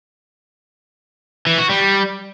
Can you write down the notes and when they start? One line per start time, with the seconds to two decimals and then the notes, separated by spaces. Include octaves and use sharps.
1.47 E3
1.58 F#4
1.69 G3